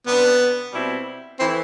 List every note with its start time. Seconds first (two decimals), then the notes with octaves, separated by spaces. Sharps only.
0.07 C3 G3 B3 D4
0.73 B2 G3 C4 E4
1.40 E3 A3 C4 E4